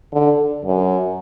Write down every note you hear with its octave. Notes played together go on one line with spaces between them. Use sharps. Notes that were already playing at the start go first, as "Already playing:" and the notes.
D3
F#2